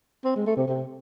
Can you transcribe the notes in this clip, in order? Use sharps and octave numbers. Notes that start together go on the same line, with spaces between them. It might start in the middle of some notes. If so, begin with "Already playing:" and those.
C4
G#3
A3
C3
C3